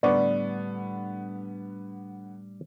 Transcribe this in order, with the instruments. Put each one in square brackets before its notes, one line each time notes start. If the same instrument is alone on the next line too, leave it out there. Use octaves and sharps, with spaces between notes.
[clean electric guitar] A2 G3 D4 [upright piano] D3 B3 C#6 [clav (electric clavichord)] D5